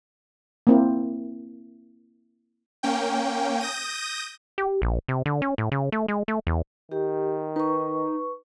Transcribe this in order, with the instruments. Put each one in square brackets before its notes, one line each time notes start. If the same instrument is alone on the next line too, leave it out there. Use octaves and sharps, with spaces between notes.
[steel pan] A#3 C4 E4
[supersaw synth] A#3 C#4 G5
D#6 G6 A#6 D#7
[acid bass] G4
A#1
C3
D3
C#4
A2
C#3
A3
G#3
A3
E2
[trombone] D#3 [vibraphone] G4
[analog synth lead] D#4 [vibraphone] B4 C#6